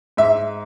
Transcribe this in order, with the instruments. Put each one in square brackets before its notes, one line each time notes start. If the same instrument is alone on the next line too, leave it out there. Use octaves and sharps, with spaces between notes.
[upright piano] G#2 E5